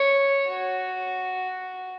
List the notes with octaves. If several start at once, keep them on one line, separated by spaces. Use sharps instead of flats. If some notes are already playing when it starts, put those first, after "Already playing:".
Already playing: C#5
F#4